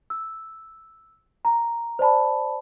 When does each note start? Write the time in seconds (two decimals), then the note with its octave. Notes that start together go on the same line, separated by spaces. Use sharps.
0.10 E6
1.45 A#5
1.99 C5 D5 A5 B5